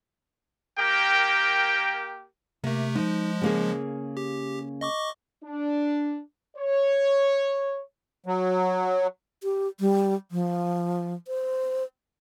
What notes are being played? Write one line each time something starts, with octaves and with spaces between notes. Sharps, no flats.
A#3 G4 A#4 G5
C3 A3 A#3
F3 G#3 D#4
C#3 A#3 G#4
G4
D#5 C#6 D6
D4
C#5
F#3
G4
G3
F3
C5